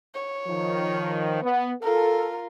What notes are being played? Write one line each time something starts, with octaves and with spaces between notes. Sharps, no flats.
C#5
D#3 F3
B3
F4 A4 A#4